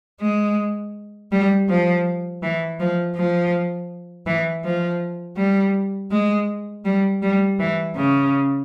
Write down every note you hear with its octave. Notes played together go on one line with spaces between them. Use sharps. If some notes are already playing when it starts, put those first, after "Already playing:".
G#3
G3
F3
E3
F3
F3
E3
F3
G3
G#3
G3
G3
E3
C#3